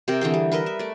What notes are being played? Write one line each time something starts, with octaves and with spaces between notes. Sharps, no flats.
C3 A#4 G5
D3 E3 G#4 G5
G3
A#4 B4 D#5 E5
E5
A3 D5